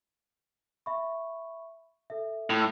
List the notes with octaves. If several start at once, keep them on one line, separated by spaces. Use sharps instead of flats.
E5 B5 C#6
A4 E5
A2